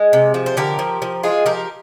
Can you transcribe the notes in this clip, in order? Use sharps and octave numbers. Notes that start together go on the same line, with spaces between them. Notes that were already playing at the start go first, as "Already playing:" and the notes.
Already playing: G#3 G#4
C3
F3
C5
D3 G4 A#4
F3
F3
G#3 F4 G#4
F3 G4 A#4